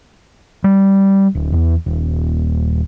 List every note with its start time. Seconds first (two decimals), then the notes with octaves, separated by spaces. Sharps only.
0.64 G3
1.35 D1
1.52 E2
1.86 D#1